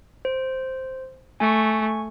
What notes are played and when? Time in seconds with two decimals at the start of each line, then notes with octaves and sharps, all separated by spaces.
0.25 C5
1.40 A3 G#5 C#6